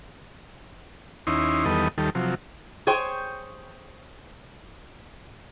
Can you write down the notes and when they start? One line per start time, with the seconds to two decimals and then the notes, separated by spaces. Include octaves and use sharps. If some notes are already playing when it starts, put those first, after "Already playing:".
1.27 D#2 C#4 D#4 E4 C6
1.66 E2 D#3 G3 B3 A4 D#5
1.98 D#2 D#3 G3 A4
2.15 C3 F3 F#3
2.87 G#4 C5 C#5 G5